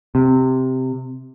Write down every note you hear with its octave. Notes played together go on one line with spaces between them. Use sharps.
C3